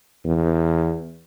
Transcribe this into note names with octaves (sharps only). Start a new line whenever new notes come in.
E2